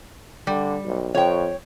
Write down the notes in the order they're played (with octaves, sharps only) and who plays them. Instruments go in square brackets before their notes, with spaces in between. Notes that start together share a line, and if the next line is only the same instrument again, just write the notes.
[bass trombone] D3 [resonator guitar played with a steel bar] G3
[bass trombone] B1
[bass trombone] F2 [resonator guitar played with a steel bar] C#5 G5